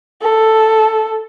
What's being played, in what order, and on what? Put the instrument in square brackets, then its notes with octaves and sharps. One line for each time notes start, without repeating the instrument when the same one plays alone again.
[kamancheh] A4